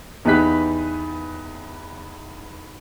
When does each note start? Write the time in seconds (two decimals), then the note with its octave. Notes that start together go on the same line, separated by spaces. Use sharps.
0.25 E2 B3 D#4 G4 F#6 B6